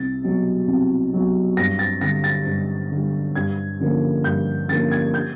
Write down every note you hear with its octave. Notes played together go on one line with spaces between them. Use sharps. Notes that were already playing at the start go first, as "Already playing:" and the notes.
Already playing: C2 A6
B2 F#3
C2
B2 F#3
G2 A#6
A6
D3 G3 A#6
A6
G2
D3 G3
G2 G#6
D3 F3 A#3 C#4
G2 G6
D3 F3 A#3 C#4 A6
G#6
G6